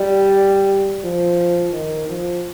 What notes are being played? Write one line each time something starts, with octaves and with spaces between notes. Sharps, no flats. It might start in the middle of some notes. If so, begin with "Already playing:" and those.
Already playing: G3
F3
D#3
F3